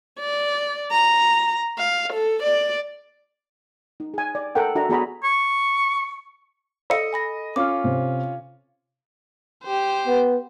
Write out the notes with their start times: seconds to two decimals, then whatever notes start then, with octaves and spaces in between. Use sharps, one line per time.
0.20 D5
0.92 A#5
1.78 F5
2.13 A4
2.43 D5
4.00 D#4
4.14 G#4 G#5
4.35 D5
4.55 A4 A#4 F#5 G5
4.75 D4 F#4 A4 E5 F#5 A#5
4.89 B3 F#4 G#4 D5 A#5 B5
5.24 C#6
6.90 A4 D#5 E6 C#7
7.13 G#5 B5 A#6
7.56 C#4 F4 D6 F6
7.84 C3
9.65 G4 C5
10.07 B3